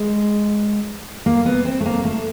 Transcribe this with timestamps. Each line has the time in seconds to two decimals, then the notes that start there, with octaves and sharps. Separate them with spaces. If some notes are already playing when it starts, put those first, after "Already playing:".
Already playing: G#3
1.26 A#3
1.46 B3
1.65 C4
1.80 A3
1.86 A#3
2.05 A3